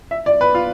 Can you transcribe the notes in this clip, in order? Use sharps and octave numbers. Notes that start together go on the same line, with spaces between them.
E5
D5
B4
F4